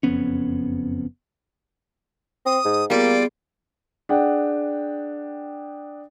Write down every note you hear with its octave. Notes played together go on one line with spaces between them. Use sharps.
F#1 F2 B3 C#4
C4 D#6
G#2
G3 A#3 B3 F4 G#4 D5
D4 G#4 F#5 G5